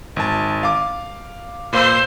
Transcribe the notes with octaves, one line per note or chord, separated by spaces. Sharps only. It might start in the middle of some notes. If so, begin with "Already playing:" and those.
G#1 A5
F5 D6
A#2 C5 F5 E6